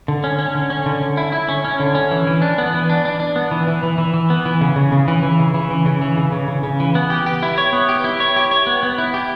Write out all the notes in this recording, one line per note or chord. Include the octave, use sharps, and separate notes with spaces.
D3
C#4
C#4
D3
C#4
D3
D3
E4
E4
C#4
C#4
D3
C#4
E3
E3
D4
B3
E3
D4
D4
D4
B3
E3
E3
E3
E3
E3
B3
E3
C#3
C#3
C#3
E3
E3
C#3
E3
E3
C#3
E3
C#3
C#3
C#3
C#3
E3
B3
G4
G4
E4
C#5
B3
G4
E4
C#5
G4
C#5
B3
B3
E4
G4